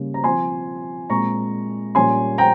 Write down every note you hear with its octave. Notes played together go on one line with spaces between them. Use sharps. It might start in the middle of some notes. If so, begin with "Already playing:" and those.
Already playing: C#3 G3 A#3 C#4
A#5
F3 C4 G#5 C6
A#2 G#3 C4 A#5 C#6
A#2 G3 C#4 G#5 C6
G5 A#5